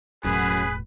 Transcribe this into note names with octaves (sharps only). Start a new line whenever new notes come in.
E1 F#2 A2 G#4 B4